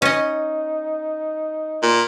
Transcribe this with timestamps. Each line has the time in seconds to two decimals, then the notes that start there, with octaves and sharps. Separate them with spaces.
0.02 C#4 D#4 D#5
1.83 A#2